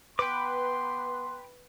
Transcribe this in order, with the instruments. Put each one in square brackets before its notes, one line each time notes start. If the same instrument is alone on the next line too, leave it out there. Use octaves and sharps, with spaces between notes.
[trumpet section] B3 C6 [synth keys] B4 [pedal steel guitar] G5 D6